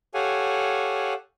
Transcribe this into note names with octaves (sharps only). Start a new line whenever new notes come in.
G4 A4 C#5 F5 F#5 G#5